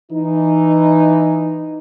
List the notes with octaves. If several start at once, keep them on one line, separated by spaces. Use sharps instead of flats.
E3 D#4